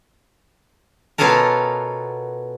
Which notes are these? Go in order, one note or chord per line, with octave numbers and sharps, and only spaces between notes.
B2 B3 C#4 F4 A4 A#4